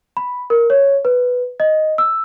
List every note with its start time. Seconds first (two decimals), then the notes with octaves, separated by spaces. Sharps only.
0.17 B5
0.50 A#4
0.70 C#5
1.05 B4
1.60 D#5
1.98 E6